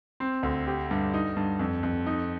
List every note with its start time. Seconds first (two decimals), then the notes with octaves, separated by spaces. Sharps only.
0.20 C4
0.43 D2
0.67 G4
0.91 G2
1.14 D#4
1.37 G2
1.59 F2
1.83 F2
2.06 D#4